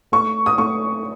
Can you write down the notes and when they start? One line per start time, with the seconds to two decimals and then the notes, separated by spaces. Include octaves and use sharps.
0.12 A3 C#6
0.46 D#6
0.58 A3 C#6